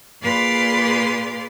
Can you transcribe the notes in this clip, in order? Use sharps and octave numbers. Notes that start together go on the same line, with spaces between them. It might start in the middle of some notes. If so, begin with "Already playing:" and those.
A#2 G#4 B4 D5 F5 C6